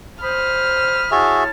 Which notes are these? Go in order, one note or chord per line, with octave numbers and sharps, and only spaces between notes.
C5 B5 D#6 F6
E4 F#4 G#4 C#5 E5 A5